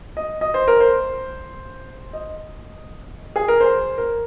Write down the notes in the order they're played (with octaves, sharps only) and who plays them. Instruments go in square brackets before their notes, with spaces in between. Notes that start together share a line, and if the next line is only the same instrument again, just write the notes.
[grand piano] D#5
D#5
C5
A#4
C5
D#5
G#4
A#4
C5
A#4